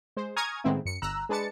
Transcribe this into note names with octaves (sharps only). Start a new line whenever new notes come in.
G#3 C5
G#5 A#5 C#6 D#6 F6 G#6
A2 D#3 G#3 B3 C4 E4
F#2 C#7
G1 A#5 E6 F#6
G#3 D4 B4 A5 A6 C#7